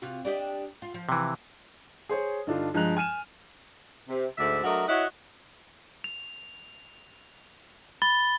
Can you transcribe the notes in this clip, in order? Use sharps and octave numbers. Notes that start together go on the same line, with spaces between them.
C3 F4 F#4
D4 G4 D#5
F4
F3
C3 E3
G#4 C5 C#5
G2 D3 D4 D#4 F4
G2 F3 G#3 A#5 F#6 F7
G#5 F6 D#7 E7
C3
D2 G#2 D3 D5 E5
F#3 A3 D4 A#4 D#5
E4 F#4 C#5 D#5 F#5
F7
B5 A6 G7